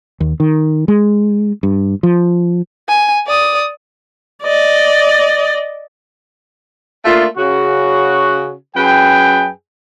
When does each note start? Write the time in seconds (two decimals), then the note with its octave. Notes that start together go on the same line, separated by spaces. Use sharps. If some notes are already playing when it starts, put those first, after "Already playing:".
0.20 D#2
0.40 D#3
0.88 G#3
1.63 G2
2.03 F3
2.89 G#5
3.27 D5 D#6
4.43 D5 D#5
7.05 A3 A#3 D4 F4
7.37 C#3 F#4
8.76 F#2 G#4 B4 G5